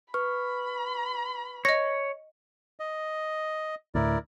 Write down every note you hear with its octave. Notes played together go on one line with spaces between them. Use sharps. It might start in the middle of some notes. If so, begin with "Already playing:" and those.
B4 B5 C#6 F6
C#5 D#5 A#6
D#5
D2 A2 E4 A#4 D5